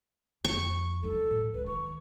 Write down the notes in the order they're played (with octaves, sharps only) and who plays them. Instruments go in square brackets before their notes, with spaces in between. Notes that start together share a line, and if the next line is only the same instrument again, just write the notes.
[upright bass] F2 [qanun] C#6
[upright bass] E3 D#4 [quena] A4
[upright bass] A2
[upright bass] C#2 [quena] B4
[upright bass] D#3 [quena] C#6